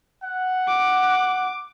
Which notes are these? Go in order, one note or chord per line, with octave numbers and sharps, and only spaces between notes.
F#5
D6